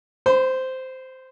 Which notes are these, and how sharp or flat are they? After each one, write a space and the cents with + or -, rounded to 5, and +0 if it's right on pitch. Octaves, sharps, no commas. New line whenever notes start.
C5 -10 B5 +40